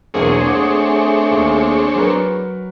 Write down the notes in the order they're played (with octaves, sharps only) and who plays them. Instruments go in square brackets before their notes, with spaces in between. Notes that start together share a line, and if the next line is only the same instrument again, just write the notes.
[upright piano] B1 E2 A#3 [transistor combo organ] C4 D4 C#5 [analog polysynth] G#4
[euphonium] A3 [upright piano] F#5 D6
[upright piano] D#2
F#3 A#4 B4